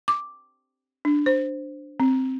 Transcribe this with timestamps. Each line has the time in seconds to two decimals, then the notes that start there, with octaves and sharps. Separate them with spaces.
0.08 D6
1.05 D4
1.26 C5
2.00 C4